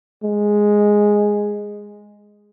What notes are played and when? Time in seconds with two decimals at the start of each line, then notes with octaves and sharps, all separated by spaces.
0.23 G#3